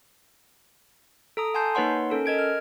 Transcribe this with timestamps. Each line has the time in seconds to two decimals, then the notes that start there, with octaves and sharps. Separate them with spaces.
1.37 A4 A#5 D#6
1.54 F#5 G#5 A5 C6 G6 C7
1.75 A#3 D#4 B4 C#5 F#5 C6
2.10 C#4 A4 A#4
2.26 A#4 D#5 G#6 D7
2.39 F6